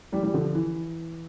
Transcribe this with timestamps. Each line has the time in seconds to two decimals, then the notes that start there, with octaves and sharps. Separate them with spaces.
0.12 E3 G3
0.23 E3 G3
0.34 D3 F3
0.55 E3